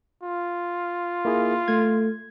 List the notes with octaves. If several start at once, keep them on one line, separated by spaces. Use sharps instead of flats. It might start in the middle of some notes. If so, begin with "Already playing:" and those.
F4
A#3 E4 G#4
A3 G#6